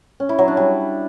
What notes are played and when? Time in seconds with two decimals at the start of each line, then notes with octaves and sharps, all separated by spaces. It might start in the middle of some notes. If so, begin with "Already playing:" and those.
0.20 C#4
0.29 E4
0.39 F#3
0.48 D4
0.57 G3